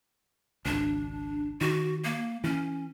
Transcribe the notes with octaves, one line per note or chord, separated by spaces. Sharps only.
G#1 C#2 D4
D#3 F#4
A#3
E3 C#4